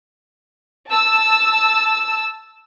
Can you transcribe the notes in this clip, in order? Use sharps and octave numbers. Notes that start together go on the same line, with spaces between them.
A5 E6